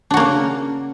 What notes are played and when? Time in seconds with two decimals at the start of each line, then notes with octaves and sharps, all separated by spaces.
0.11 D4
0.14 F#4
0.17 A#3
0.20 C#3